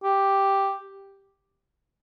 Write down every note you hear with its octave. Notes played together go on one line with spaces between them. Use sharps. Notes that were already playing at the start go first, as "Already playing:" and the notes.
G4